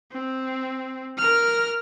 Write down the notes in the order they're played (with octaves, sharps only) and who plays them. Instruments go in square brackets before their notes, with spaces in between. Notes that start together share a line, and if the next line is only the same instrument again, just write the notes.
[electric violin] C4
A#4 F6